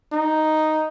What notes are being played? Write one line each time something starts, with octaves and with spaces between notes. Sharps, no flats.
D#4